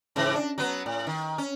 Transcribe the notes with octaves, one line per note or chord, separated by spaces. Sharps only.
G#2 C#3 E3
D4
F#3 B3
A2
D#3
C#4